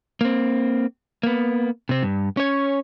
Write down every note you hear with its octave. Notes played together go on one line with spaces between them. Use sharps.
A#3 C4
A#3 B3
C3 C4
G2
C#4 C#5